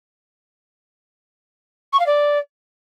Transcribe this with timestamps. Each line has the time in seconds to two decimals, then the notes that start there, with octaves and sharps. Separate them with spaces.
1.92 C#6
1.99 F5
2.06 D5